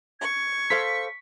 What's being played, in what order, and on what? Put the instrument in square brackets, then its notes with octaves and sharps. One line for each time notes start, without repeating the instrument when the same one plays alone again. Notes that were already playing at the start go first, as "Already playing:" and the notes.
[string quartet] C#6 [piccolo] G#6
[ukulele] A4 C5 F5 [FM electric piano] B6